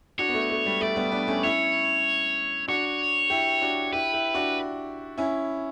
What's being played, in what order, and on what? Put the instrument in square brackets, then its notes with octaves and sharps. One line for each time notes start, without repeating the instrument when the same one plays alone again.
[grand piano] D4 F#4 [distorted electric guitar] C#5
[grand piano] B3
A3
A3
G3
[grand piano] A3 [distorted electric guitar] D5
[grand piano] G3 B3
B3 D4
A3 C#4
[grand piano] C#4 E4 [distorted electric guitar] C#5
[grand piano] D4 F#4 [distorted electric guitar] C#5
[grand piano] E4 G4
D4 F#4
[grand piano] E4 G4 [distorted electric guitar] B4
[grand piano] E4 G4
D4 F#4
C#4 E4